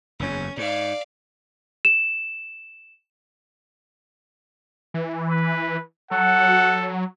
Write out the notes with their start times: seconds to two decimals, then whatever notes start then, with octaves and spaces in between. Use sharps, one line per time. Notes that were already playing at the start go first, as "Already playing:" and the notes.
0.20 F#1 E2 C#4
0.57 G#2 D5 F5
1.85 E7
4.94 E3
5.29 B4
6.11 F#3 A4 F#5